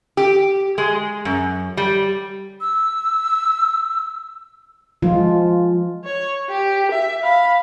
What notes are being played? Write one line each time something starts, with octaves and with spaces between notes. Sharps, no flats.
G4
G#3
F#2
G3
E6
F3 G#3 F4
C#5
G4
E5
F5 B5